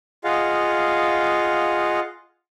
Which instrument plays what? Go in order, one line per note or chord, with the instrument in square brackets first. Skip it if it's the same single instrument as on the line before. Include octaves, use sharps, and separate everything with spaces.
[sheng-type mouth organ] F4 G#4 D#5 F5 F#5